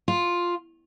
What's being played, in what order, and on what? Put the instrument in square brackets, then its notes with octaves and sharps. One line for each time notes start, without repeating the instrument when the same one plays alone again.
[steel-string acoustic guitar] F4